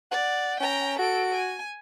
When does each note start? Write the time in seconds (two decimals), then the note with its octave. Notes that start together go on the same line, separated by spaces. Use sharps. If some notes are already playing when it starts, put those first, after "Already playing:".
0.12 D5 F#5
0.60 C#4 G5 A#5
0.99 F#4 A4 D7
1.34 G#5